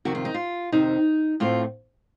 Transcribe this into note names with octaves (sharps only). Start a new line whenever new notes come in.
F2 C3 D#3 F#4
F4
D#4
F4
F2 C3 D#3 D#4
A2 A3 C4 F4